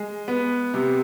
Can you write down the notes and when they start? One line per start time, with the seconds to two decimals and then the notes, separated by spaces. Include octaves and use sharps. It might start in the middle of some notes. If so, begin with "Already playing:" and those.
Already playing: G#3
0.28 B3
0.74 C3